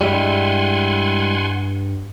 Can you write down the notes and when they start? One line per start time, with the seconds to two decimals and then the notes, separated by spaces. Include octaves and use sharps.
0.01 G2 G3 G#3 E4 F#5 G#5 C6